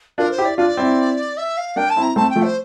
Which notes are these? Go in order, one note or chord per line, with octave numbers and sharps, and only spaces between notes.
D4 F4 A#4
C5
E4 G4
D5
D4 F4 D5
C4 E4
E5
F5
A#3 D4 G5
A5
C4 E4
A#5
A3 C4 A5
G5
F3 A3
C5